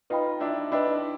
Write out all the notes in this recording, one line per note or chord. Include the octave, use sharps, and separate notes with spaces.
D#4 F4 B4 D#5 G5 B5
D4 E4
D4 E4 B4 D#5 G5 B5